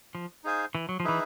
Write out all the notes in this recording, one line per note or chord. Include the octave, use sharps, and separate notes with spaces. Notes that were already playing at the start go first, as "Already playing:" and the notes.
F3
D#4 G#4 C5 F5 G#5
E3
F#3
F3
E3 D#4 G#4 B4 E5